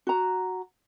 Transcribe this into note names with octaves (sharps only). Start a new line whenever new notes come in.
F#4 A#5